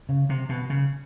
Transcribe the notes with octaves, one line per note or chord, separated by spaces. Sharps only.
C#3
C3
B2
C#3